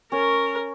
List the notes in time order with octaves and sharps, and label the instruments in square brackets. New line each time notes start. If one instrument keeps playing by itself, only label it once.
[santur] C#4 [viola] A#4